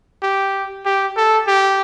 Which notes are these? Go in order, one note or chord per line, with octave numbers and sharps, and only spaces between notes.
G4
G4
A4
G4